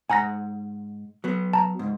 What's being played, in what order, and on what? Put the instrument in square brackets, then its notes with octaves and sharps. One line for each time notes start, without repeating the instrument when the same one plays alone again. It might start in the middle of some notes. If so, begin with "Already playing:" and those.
[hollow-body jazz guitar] G#2 F#5 [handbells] G#5 A#5 A#6
[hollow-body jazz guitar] F#3 B3
[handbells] A5 A#5
[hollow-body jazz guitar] C#2 G#2